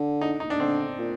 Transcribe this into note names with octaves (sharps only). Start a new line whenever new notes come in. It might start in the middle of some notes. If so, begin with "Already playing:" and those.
Already playing: D3
D#4
D#4
D4
D3 C4
A#2